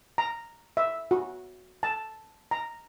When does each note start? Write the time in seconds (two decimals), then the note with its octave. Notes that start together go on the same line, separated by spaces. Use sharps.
0.18 A#5
0.77 E5
1.11 F#4
1.83 A5
2.51 A#5